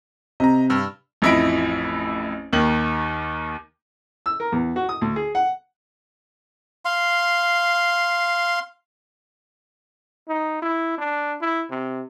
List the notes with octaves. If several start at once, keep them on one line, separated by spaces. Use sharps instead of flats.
C3 D#5 A#5
G2 E6 F6
A1 F2 E4 D#5 B5 D7
D#2 D#3 F#7
E6
A#4
E2
F#4
D#6
D2
G#4
F#5
F5 C6
D#4
E4
D4
E4
C3